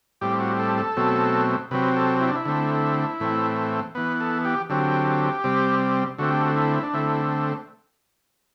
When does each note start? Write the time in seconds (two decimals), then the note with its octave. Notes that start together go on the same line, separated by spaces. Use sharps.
0.21 A2 G3 C4 G4
0.40 F#4
0.59 A4
0.77 A4
0.97 B2 F#3 A3 C4
1.71 C3 F#3 C4 B4
1.96 A4
2.21 E4
2.28 D4
2.36 E4
2.45 D3 A3 C4
3.20 A2 E3 A3 C4
3.95 E3 B3 B4
4.20 A4
4.45 G4
4.69 D3 F#3 C4 G4
5.44 C3 G3 C4
6.18 D3 A3 C4 F#4
6.31 G4
6.41 F#4
6.56 E4
6.83 D4
6.93 D3 A3 C4 E4